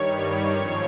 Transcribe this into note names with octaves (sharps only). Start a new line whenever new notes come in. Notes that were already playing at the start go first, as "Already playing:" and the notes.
Already playing: G2 D#3 G3 C#5
G#2 F3 C4 C#5